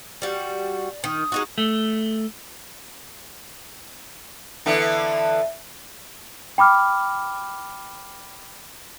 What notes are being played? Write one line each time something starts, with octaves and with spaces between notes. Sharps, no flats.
G3 F#4 D5
D#3 D#6
G#3 D#4 F#4
A3
D3 E3 B3
G5 B5 D6 F6